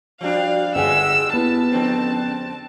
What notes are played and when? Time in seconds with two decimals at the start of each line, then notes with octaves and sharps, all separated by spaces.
0.21 F3 G3 D4 F#4 F5
0.75 G1 G3 G#3 G#4 F#5 G#5 E6
1.33 B3 E4 A5
1.72 F2 D3 C4 C#4